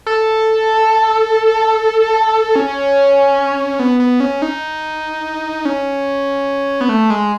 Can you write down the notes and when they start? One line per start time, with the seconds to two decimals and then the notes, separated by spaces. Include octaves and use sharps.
0.07 A4
2.56 C#4
3.79 B3
4.00 B3
4.20 C#4
4.42 D#4
5.65 C#4
6.81 B3
6.89 A3
7.10 G#3